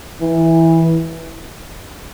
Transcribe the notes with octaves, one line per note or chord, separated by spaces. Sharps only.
E3